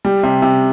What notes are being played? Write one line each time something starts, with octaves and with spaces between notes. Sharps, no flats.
G3
C3
C3